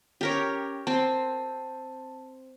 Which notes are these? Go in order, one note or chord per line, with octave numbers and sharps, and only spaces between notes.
C#4 G4 A#4 C#5
C4 A5